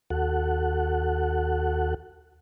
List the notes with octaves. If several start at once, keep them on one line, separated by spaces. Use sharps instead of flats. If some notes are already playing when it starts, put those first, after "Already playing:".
D#2 F#4 A4 F#5